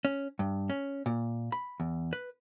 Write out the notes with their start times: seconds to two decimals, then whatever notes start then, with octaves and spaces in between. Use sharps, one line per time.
0.05 C#4
0.39 G2
0.70 C#4
1.06 A#2
1.52 B5
1.80 E2
2.13 B4